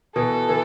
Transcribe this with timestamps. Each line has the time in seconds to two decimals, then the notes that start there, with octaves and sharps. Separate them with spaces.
0.15 B2 E3 A4
0.49 E3